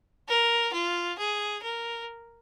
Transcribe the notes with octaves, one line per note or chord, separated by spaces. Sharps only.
A#4
F4
G#4
A#4